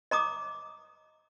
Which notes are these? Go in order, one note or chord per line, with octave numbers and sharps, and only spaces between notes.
D#5 A#5 D6 D#6